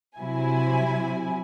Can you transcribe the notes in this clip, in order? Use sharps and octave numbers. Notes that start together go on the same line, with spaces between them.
C3 F#3 E4 G#5